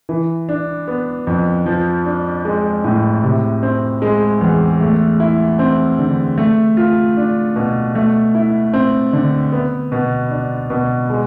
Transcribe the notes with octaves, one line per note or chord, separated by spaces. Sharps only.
E3
D4
B3
F2
F3
D4
G#3
A2
C3
C4
G#3
E2
A3
E4
C4
D3
A3
F4
D4
B2
A3
E4
C4
D3
B3
B2
D4
B2
G#3